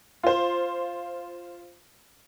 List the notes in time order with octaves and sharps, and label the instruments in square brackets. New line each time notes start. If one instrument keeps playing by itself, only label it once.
[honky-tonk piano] F4 C5